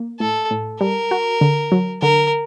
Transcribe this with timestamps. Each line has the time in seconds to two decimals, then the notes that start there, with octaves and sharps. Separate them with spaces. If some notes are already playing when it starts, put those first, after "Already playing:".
Already playing: A#3
0.20 A2 A4
0.51 A2
0.81 G3 A#4
1.11 F#4
1.41 D3
1.72 F#3
2.02 D3 A#4